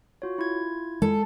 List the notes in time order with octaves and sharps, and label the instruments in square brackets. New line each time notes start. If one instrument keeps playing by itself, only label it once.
[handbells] F4 F#4 C#5
E4 F4 G#6
[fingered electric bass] G#3 [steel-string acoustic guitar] A4